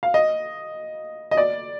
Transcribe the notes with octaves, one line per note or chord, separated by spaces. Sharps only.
F5
D#5
D#5
D5